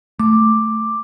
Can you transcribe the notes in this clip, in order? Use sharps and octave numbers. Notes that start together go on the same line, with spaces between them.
A3 D6